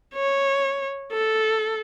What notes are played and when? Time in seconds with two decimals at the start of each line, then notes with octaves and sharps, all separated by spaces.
0.14 C#5
1.12 A4